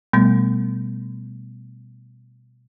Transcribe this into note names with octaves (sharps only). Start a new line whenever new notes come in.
B2 G3 A3 B3